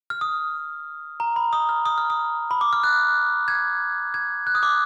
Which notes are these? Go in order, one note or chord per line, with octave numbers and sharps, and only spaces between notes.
F6
D#6
A#5
B5
D#6
F6
D#6
F6
D#6
B5
D6
F6
F#6
G#6
G#6
F#6
D#6
D6